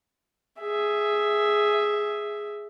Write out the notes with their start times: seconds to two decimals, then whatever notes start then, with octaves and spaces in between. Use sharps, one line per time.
0.60 G#4 E5